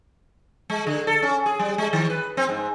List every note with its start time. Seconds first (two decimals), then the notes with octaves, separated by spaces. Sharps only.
0.70 G#3
0.87 D3
1.07 A4
1.22 C#4
1.46 G#4
1.59 G3
1.78 G#3
1.93 D#3
2.10 B4
2.37 C4
2.49 G#2